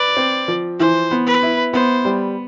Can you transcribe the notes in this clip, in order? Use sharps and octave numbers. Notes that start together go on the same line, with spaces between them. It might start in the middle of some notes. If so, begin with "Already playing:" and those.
Already playing: B4 D5
C4
F3
E3 C5
B3
B4
E4
B3 C5
G3